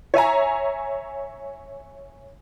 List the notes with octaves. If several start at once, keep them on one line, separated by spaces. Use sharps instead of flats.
C#5 E5 G#5 A#5